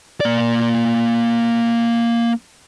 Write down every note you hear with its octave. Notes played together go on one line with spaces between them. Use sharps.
A#3 D5